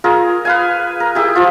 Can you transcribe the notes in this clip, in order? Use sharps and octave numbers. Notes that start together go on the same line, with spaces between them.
F4 G#4 A#4
B4 F5 G#5
A#4
E4 G4 G#4
F3 F4